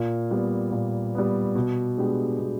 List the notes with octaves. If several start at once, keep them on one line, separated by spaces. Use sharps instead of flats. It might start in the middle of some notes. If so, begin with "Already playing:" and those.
Already playing: A#2
G3 B3
A#2
G3 B3
B2
G#3 B3 D4 G4
B2